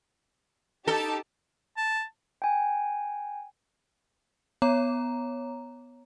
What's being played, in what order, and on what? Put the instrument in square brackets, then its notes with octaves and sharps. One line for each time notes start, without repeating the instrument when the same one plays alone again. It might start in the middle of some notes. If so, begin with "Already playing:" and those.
[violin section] D#4 G4 A5 [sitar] A4
[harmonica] A5
[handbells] G5 G#5
[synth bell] B3 C#5 A#5